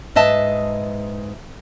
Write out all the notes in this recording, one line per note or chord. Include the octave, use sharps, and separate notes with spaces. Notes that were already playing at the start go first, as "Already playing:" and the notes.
G#2 B4 D#5 E5 A5